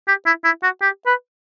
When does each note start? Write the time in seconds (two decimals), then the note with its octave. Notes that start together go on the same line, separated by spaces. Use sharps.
0.08 G4
0.26 E4
0.44 E4
0.63 F#4
0.81 G4
1.06 B4